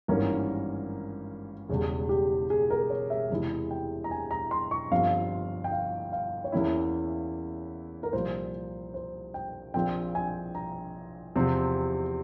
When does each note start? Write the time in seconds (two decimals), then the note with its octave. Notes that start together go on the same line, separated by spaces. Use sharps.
0.08 G#1 G2 E3 A#3 C#4 A#4
1.69 E1 E2 C#3 G3 G#4
2.09 G4
2.50 G#4
2.70 A#4
2.90 C#5
3.10 E5
3.30 E2 C3 E3 G#3 E4
3.71 G5
4.04 A#5
4.11 G#5
4.31 A#5
4.51 C6
4.71 C#6
4.91 G1 G2 F3 C4 F5
5.64 G5
5.72 F5
6.12 F5
6.44 C#5
6.52 E2 E3 A#3 C#4 E4 E5
8.03 A#4
8.13 C2 A#2 F3 C5
8.94 C5
9.34 G5
9.74 A#1 A#2 F3 C4 G5
10.15 G#5
10.55 A#5
11.36 E2 C3 F3 C4